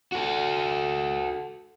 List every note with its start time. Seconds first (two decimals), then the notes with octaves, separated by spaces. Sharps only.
0.12 F#4 A4